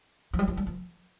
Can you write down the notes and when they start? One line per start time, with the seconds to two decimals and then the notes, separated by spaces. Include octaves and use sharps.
0.33 F3
0.39 G3
0.48 F3
0.57 G3
0.67 F3